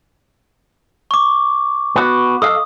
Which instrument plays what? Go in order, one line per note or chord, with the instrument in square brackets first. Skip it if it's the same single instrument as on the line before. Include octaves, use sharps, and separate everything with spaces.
[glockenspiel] C#6 D6
[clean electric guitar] B3 F#4
[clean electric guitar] A4 D#5 F5 [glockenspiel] D#6